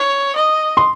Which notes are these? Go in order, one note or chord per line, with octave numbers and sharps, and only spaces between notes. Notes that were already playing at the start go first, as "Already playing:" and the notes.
Already playing: C#5
D#5
C6